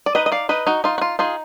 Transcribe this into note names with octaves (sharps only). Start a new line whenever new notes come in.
D5
D#4 B4 D#5
D#5
D5 F5
D#4 B4 D#5
D#4 F#4
D#4 F4
F#4
F4
D#4 F4 G#4